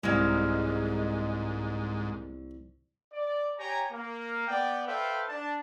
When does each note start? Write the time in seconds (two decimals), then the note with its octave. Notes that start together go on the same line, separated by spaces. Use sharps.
0.04 C2 G#2 G#3 A#3 D#5
3.12 D5
3.57 G4 C#5 G5 G#5 A#5
3.91 A#3
4.47 B3 D5 G5
4.86 A4 B4 C5 E5 F5 G5
5.28 D4 A5